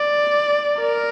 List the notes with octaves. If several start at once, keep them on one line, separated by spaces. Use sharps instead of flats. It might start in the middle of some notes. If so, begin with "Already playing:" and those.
Already playing: D5
A#4